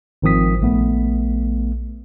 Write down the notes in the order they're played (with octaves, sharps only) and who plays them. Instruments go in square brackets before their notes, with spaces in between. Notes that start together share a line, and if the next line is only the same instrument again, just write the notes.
[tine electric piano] G#1 D#3 F3 C4 D#6 B6
A#1 A3 B3